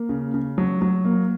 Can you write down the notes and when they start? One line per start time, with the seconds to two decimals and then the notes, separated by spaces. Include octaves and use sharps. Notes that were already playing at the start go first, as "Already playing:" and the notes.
Already playing: A#3
0.09 C#3
0.34 C#3
0.58 F#3
0.82 F#3
1.05 A#3